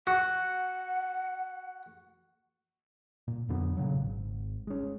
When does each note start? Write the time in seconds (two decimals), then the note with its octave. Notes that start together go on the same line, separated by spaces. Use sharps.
0.07 F#4 F#5
3.28 A#2
3.49 F2 D3 F#3 B3
3.77 A#2 C#3 F#3
3.95 G#1
4.67 G#3 C#4